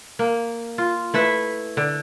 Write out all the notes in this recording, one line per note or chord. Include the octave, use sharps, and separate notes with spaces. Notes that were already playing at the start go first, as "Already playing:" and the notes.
A#3
F4
A3 E4 B4 E5
D3